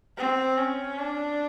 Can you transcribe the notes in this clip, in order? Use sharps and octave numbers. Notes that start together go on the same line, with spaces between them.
C4
C#4
D4